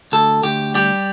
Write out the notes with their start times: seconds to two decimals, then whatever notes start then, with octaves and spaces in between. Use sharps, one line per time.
0.12 D2 A4
0.43 D2 G4
0.74 G3 G4